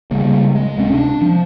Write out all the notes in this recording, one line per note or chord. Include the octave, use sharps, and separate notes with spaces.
C#3 G3 G#3 A#3
G#3
D1 C3 C4 C#4
D4
F3